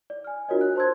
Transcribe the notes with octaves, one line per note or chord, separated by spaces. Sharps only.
D5
G#5 F6
D4 F4 F#4 A#4 C#5 D#5
F#6
C5 A5 C6 E6 G#6